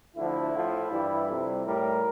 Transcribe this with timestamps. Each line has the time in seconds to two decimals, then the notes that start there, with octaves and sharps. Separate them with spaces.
0.17 D2 D3 F3 E4
0.54 A2 F3
0.91 G2 E3 G3
1.28 F2 C3 G3
1.66 A2 G3 A#4